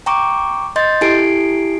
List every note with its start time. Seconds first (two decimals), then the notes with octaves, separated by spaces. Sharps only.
0.06 G5 A#5 C#6 D6
0.76 D#5 C6 G6 A6
1.01 E4 G4 A4 G#5 C7 D7